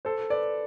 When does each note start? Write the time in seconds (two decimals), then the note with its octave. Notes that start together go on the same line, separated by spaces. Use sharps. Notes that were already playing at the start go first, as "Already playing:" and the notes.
0.05 A4 C5
0.30 B4 D5